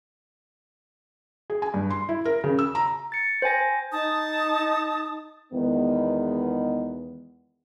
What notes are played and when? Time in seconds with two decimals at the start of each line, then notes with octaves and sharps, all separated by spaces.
1.50 G#4
1.62 G#5
1.74 G2
1.91 C6
2.09 E4
2.25 A#4
2.44 C#3
2.59 E6
2.75 A#5
3.12 A6 C#7
3.42 C5 G5 G#5 A#6
3.92 D#4 A5 D#6
5.53 E2 D#3 G#3 B3